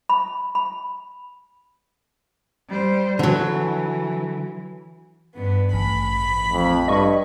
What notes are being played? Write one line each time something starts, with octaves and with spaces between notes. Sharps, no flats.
B5
B5
G3 C5
D3 E3 F#3
G2 B3
A1 B5
F2
G2 D#5 C#6